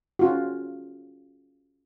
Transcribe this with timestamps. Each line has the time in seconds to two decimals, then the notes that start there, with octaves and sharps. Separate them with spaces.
0.19 C#4 F4 F#4